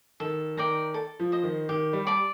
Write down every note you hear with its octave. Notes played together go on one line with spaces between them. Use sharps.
D#3 A4
D#3 D5 G5 A#5
A4
F3
C5 D#5
D#3
D#3 G4
G3
D5 A5